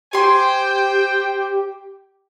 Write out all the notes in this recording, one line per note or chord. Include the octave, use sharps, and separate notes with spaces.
G4 C5 G5 G#5 C6